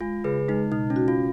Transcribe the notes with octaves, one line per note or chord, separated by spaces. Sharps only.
G#3 F4
C#3 G#4 B4
G#3 D#4
B2 D#4
C#4
F#4
F4